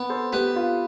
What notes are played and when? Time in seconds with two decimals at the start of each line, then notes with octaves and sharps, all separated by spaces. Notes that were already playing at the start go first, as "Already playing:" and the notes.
Already playing: B3
0.09 A4 C5
0.33 B3 G4 B4
0.56 F4